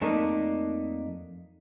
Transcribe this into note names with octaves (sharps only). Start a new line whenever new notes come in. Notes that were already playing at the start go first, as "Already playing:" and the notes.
F2 A3 A#3 D4 D#4